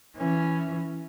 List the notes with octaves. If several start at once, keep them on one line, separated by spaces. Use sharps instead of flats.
E3 C#4